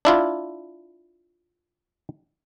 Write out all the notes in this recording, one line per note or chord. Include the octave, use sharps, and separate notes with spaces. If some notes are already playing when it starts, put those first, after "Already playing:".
D4 E4 F4